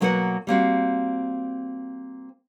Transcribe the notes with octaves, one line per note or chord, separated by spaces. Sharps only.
B2 F#3 A#3 B4 C#5 F#5
G3 A#3 C4 F#4